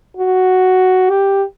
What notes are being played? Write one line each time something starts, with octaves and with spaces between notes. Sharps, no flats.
F#4
G4